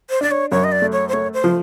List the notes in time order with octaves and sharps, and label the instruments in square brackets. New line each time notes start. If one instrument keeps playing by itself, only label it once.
[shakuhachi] C5
[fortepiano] D4 [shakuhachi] D5
[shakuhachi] C#5
[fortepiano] F#2 [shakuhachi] C#5
[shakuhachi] D#5
D5
[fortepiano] A3
[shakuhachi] C#5
C5
[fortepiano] A3 [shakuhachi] C#5
[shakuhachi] C5
[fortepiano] F3